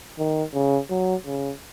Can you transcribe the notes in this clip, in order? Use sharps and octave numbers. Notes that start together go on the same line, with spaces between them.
D#3
C#3
F#3
C#3